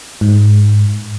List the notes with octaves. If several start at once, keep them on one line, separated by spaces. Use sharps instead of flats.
G#2